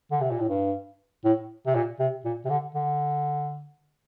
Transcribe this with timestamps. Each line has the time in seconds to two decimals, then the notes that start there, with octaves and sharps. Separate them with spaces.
0.11 D3
0.21 C3
0.31 A#2
0.40 A2
0.50 G2
1.25 A2
1.66 C3
1.75 A#2
2.00 C3
2.25 A#2
2.45 C3
2.50 D3
2.75 D3